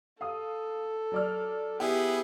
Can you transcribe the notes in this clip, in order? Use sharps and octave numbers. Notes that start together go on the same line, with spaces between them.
A4 F5 D#6
F#3 D5 F6
B3 E4 G4 G#4 G5